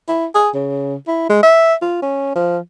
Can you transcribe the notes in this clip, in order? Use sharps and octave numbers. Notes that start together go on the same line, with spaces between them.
E4
G#4
C#3
E4
G#3
E5
F4
C#4
F3